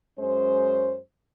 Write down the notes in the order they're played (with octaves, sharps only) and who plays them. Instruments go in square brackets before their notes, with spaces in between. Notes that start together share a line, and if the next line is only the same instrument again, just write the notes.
[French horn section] F#2 G#3 C#4 C5